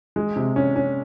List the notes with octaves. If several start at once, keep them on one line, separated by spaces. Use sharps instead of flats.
G#3
C3
C#4
C#4